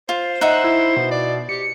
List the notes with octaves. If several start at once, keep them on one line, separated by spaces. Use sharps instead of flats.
F4 C5
D#4 E5 F#5 F#6
E4
B2
D5
G4 C#7